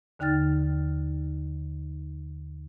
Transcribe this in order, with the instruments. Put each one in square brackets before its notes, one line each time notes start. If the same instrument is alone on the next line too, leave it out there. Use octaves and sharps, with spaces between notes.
[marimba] D#2 D3 D#4 G5 F6 A6